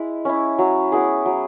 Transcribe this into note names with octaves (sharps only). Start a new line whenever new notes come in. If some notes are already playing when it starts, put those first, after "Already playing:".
Already playing: G#3 E4
C#4 E4
F#3
B3 E4 G#4
F#3